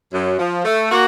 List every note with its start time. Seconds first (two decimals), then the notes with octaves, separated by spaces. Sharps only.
0.13 F#2
0.39 F3
0.65 A3
0.91 A#3 F#4